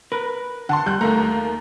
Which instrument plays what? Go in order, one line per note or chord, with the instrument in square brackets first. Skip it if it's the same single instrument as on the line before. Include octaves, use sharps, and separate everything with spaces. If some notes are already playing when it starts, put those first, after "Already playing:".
[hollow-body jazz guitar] A#4 B4
[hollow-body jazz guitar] D3 [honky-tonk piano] F#5 A5 C6
[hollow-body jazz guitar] G3 [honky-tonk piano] F#6 G6
[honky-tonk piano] D#2 A#3 A#5 [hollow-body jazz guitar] A3